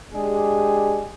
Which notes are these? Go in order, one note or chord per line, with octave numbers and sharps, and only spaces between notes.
G#3 D4 G4 G#4